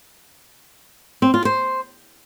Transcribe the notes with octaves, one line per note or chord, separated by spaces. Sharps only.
C4
F4
C5